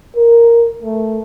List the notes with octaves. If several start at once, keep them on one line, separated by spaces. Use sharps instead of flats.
A#4
A3